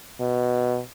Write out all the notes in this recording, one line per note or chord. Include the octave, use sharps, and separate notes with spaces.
B2